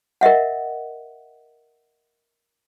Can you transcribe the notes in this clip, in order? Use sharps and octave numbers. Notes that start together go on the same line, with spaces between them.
A#4 D#5 E5 F#5